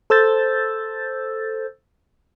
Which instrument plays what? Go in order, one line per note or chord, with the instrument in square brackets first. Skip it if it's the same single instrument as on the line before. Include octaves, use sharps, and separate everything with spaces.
[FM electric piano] A4 C5 E6 G6 A6